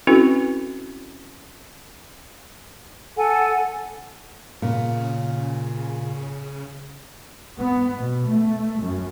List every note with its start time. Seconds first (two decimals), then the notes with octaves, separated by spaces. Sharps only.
0.07 C4 C#4 E4 F#4 A4 B4
3.16 A4 F#5 G#5
4.62 A#2 C#3
7.58 B3
7.96 B2
8.27 A3
8.79 F#2